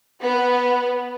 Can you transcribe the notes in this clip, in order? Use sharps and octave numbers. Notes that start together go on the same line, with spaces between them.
B3